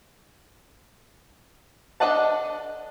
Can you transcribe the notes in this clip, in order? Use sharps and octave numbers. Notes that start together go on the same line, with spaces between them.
D4 A4 D#5 F#5 A5